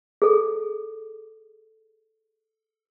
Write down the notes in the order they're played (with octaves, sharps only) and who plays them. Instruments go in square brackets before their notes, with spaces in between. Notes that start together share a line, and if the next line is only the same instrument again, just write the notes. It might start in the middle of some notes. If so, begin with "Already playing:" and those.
[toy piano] G#4 A4